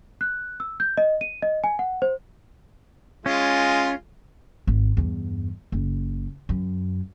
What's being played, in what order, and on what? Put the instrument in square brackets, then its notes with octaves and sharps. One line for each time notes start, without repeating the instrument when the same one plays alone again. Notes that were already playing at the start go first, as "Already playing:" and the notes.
[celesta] F#6
E6
G6
D#5
D#7
D#5
G#5
F#5
C5
[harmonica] G#3 F4 [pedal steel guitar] C#4
[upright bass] G#1
E2 G2
F#1
F#2